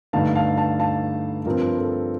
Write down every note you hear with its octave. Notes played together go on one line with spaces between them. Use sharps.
G2 D3 A3 D#4 F5 A5
F5 A5
F5 A5
F5 A5
G2 F3 C4 A#4
A4